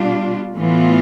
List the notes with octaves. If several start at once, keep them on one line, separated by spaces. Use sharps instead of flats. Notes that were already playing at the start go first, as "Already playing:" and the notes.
Already playing: B2 G3 D4 F4
A2 E3 B3 F4